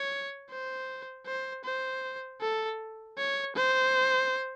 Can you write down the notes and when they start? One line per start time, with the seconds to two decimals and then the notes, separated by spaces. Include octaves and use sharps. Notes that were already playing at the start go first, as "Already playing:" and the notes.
Already playing: C#5
0.50 C5
1.26 C5
1.64 C5
2.41 A4
3.17 C#5
3.56 C5